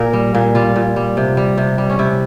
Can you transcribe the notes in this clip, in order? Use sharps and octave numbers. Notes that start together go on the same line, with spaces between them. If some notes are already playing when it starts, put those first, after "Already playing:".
Already playing: A#2 A#4
G3
A#2
G3 F4
A#2
G3
C3
G3
C3
G3
C#4
C3 E4